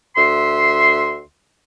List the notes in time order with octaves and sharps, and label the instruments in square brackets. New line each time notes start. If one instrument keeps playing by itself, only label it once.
[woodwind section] D2 E5 C6